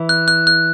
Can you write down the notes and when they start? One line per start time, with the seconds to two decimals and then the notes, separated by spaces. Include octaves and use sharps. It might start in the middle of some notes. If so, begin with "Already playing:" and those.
Already playing: E3
0.09 F#6
0.28 F#6
0.47 F#6